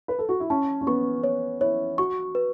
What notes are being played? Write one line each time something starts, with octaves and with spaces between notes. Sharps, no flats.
B4
A4
F#4
E4
C#4 A5
C#4
B3 C#6
C#5
E4 C#5
F#4 C#6
B4